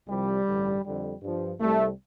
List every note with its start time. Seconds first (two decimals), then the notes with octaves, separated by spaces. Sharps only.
0.08 C2 C3 F3 G3
0.46 A1 G2 D3
0.85 F2 D3 G3
1.22 G2 F3
1.60 C2 C3 G3 A3